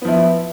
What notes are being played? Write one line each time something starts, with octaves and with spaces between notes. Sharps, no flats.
F3 B3 E4